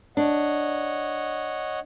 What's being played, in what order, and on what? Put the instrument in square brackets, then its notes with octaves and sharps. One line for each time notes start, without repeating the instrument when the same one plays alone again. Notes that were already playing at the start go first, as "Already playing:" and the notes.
[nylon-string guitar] D4 [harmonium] C#5 D#5 F#5